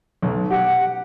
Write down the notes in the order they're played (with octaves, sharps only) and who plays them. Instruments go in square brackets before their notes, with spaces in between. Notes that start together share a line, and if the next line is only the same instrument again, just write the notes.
[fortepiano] B1
[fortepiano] G4 [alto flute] F#5